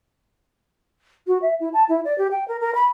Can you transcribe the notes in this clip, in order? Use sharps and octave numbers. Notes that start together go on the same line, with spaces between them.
F#4
E5
E4
A5
E4
D5
G4
G5
A#4
A#4
B5